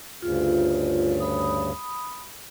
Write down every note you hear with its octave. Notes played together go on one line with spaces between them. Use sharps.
D2 G2 C#3 F4
B5 D#6